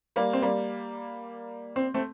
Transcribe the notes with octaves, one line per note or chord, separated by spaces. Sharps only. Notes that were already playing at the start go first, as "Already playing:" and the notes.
G3 A#3
C4
G3 A#3
C4
A3 C4